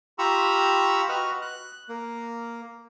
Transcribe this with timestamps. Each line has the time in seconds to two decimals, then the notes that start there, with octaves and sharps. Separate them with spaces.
0.19 F4 G4 A#5 B5 C#6 E6
1.09 F#4 B4 D#5 F#5 C#6 F6
1.42 F#6
1.89 A#3